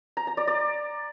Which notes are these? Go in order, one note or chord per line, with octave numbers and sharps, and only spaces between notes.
A#5
A#5
D5
D5